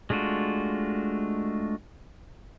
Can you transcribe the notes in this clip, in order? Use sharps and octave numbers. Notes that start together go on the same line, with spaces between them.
G#3 A3 D4 F4 F#4